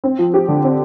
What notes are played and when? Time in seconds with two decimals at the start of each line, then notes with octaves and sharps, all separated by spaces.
0.04 C4
0.19 F3
0.34 G4
0.48 D3
0.64 C4